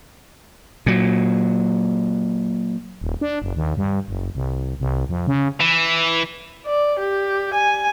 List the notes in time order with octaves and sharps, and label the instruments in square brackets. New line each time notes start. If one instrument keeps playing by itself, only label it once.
[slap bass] A#2 F#3
[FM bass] D#1
D4
F#1
D#2
G2
F#1
C2
C2
F2
C#3
[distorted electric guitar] E3
[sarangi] D5
G4
G#5